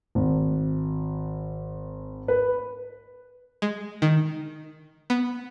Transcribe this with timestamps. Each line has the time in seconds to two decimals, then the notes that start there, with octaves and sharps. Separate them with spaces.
0.15 G#1
2.28 B4
3.62 G#3
4.02 D#3
5.10 B3